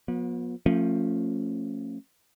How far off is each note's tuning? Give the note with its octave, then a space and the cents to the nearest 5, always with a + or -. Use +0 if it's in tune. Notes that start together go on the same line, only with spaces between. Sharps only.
F3 +40 B3 -35
F3 +0 A3 +25 C#4 -15